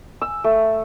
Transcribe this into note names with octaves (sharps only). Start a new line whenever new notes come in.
E6
A3